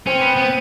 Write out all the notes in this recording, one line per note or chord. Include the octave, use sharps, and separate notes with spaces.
C4 C#4
B3
B3
C4